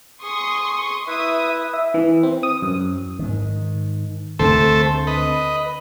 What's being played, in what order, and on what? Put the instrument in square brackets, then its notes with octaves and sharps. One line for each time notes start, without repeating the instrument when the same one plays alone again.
[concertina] G#4 [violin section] C6 C#6 D#6
[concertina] E4 B4 [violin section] E5 D#6
[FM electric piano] E5
E3
C4
D#6
F#2
[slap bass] G#2 D#3
[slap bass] D2 D3 C4 [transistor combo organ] A3 A4 C5
[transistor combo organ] B4 D#5